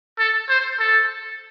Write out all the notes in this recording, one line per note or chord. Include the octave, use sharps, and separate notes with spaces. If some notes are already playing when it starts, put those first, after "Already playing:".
A4
C5
A4